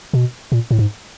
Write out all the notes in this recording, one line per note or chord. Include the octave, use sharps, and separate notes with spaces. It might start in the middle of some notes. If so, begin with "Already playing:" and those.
B2
A#2
A2
G#2